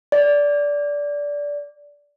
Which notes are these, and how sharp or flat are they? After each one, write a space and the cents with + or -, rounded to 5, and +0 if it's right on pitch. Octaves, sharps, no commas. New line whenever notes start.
D5 -15